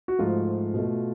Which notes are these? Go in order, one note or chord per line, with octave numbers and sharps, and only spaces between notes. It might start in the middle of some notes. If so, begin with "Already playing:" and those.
F#4
G#2 F3 A3 F4
B2 A3